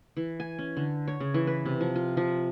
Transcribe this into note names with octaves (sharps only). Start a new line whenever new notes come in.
E3
G#5
C#4
D3
C#5
C#3
E3
B4
C3
F3
F4
F3